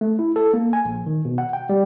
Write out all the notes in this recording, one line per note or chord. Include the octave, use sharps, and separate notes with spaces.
A3
E4
A4
A#3
G#5
A#1
D#3
B2
F#5
G5
G3